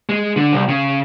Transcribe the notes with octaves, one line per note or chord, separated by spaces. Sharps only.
G#3
D3
C2
C#3